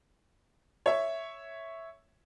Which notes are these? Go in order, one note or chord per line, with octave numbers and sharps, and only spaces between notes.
C#5 E5